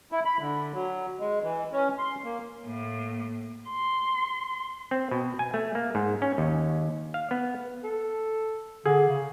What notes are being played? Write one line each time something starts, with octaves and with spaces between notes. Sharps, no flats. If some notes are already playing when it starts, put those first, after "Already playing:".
E4
B5
D3
F#3
G#3
E3
C#4
C6
A#3
A2 A#3
C6
C4
B2
G#5
A3
A#3
G#2
C#4
D#2
F5
B3
A4
D3 G#4
C#3